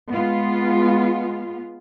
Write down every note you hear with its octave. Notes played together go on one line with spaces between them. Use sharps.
G#3 B3 F4